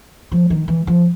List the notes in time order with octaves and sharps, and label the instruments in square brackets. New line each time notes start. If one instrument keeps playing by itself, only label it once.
[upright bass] F3
D#3
E3
F3